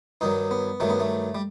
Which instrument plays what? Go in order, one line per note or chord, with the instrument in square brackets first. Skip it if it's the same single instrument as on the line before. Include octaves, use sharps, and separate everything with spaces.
[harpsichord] G2 D#3 F#3 D#4
B3
G2 D#3 F#3 A3
B3
A3
G3